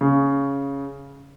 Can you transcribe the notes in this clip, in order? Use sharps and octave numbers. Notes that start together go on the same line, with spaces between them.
C#3